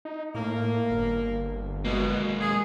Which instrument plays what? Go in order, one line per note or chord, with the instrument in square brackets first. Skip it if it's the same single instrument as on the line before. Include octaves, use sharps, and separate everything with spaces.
[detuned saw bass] D#4
[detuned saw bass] A2 [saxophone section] A#3
[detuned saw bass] G1
[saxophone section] B2 [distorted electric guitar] G#3 A#3
[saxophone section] G#4